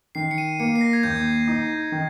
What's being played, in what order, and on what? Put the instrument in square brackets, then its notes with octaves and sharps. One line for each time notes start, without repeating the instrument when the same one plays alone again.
[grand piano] D#3 [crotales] C7
[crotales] C#7
D#7
[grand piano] A#3 [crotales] C#7
[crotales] C7
A#6
G#6
[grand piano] D#2 [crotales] G6
[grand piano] D#4
D#3